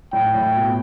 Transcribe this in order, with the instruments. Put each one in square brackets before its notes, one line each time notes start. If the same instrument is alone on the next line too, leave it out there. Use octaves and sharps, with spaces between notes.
[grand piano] A2 [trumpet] G5
[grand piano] A2
B2